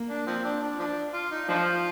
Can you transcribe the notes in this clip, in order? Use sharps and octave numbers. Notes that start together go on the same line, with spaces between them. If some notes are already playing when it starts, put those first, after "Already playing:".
Already playing: A#3
D4
F3 C4
D4
D4
F3 D4
F4
D#4
F3 D4 F4